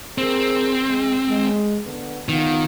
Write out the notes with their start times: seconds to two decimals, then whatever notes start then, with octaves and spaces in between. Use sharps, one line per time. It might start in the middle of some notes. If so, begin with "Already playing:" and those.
0.18 C4 G#4 A#4
0.86 G#3 G#4
1.27 G#3
1.85 D3 B3
2.29 D#3 B3 F4